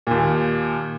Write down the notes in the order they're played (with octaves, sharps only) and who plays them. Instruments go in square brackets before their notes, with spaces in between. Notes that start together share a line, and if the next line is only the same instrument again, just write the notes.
[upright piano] D#2 A#2